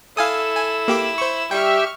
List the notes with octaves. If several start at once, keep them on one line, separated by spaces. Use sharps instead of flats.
E4 A4 F5 G#5 D#6 E6
G#5
A#3 G4 D6
C5 C#6
G3 G4 E5 G5 C#6 F6